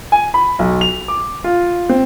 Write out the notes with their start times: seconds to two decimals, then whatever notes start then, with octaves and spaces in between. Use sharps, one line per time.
0.12 G#5
0.34 B5
0.59 B1
0.81 F7
1.08 D6
1.44 F4
1.89 C4